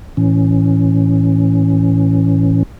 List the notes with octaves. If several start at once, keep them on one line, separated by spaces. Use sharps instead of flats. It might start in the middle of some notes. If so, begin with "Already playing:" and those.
A2 E3 C#4